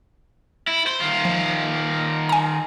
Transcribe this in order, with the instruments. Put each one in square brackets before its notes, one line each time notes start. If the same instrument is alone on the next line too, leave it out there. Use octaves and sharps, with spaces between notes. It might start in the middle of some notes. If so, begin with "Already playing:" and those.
[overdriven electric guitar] E4
C5
D#3 F4
[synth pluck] F3
G#5 A#5